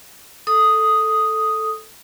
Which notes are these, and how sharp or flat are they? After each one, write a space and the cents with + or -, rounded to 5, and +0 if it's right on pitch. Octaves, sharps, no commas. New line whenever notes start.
A4 +0 D#6 +0